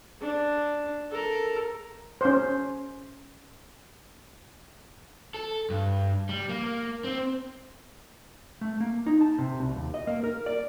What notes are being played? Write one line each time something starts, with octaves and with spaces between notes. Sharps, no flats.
D4
A4 A#4
C#4 C5
A4
G2
G3
A#3
C4
A3
A#3
D#4
A5
C3
C2
D#2
D#5
A#3
A#4
D5